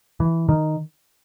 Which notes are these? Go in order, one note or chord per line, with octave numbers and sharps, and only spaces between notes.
E3
D#3